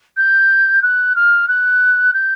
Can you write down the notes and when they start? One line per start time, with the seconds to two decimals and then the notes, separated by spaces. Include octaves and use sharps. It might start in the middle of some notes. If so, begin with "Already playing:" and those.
0.17 G6
0.82 F#6
1.16 F6
1.48 F#6
2.14 G6